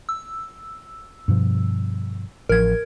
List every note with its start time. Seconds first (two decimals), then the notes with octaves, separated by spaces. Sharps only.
0.09 E6
1.28 G2 B2 F3
2.49 A1 F3 A#4 G#6